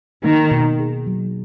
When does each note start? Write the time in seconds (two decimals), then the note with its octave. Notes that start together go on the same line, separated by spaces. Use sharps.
0.24 D#3 A#3
0.51 B2
0.80 G#4
1.07 F#3